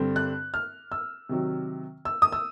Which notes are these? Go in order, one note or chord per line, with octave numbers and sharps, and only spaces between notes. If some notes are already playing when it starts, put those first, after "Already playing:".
Already playing: G2 D3 G3 C4
F#6
F6
E6
C3 D#3 F#3
E6
D#6
E6